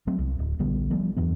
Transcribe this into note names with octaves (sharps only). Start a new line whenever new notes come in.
F#3 A3 C4
C2
D1
A#1 D3 G3 B3
F3 G3 A3 B3
E2 G2 E3 B3